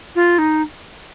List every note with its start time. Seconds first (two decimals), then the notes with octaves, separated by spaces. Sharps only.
0.15 F4
0.38 D#4